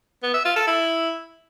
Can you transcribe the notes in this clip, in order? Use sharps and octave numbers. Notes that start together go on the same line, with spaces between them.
B3
E5
F4
A4
E4